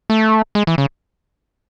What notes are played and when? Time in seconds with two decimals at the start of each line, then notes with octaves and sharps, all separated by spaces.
0.10 A3
0.55 G#3
0.67 E3
0.78 C#3